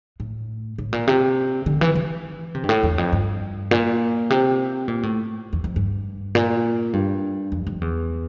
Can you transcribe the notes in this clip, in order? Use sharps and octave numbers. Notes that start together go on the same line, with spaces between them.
A2
A2
A#2
C3
D3
E3
E3
C3
G2
A2
E2
F2
G2
A#2
C3
A#2
A2
E2
F2
G2
A#2
G2
F2
F2
E2